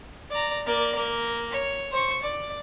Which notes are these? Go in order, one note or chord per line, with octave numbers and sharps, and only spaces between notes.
D5 A#5
A#3 D5
A#3
C#5
C5 C#6
D5